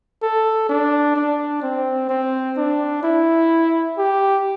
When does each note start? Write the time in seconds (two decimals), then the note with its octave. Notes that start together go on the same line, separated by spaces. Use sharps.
0.22 A4
0.69 D4
1.16 D4
1.63 C4
2.09 C4
2.57 D4
3.03 E4
3.98 G4